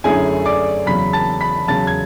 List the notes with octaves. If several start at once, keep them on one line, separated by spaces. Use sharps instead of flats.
F#2 D3 A3 C#4 E4 G#4 G#5
D5 D6
E2 C#3 F#3 B5 B6
A5 A6
B5 B6
E2 C#3 F#3 A5 A6
G#6